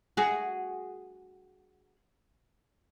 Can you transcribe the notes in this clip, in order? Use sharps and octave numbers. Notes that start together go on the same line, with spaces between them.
F#4 G#4